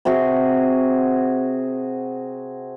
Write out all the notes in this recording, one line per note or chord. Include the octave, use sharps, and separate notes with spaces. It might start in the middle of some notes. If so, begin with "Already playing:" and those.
C3 C4 F#4 G#4